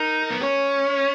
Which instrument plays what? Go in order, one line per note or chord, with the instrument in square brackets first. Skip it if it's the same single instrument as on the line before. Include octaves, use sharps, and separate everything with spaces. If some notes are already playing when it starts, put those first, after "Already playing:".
Already playing: [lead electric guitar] D#4 [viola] A#4
[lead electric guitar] B3
[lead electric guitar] C#4 [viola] C#5